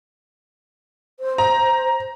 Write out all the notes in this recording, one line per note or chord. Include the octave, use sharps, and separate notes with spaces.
C5
A#5